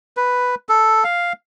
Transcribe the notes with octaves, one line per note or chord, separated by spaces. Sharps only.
B4
A4
F5